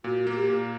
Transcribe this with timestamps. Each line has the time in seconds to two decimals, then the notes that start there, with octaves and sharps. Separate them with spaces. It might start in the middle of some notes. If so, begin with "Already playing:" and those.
0.04 A#2 F#4
0.27 A#3
0.34 G4
0.50 A#2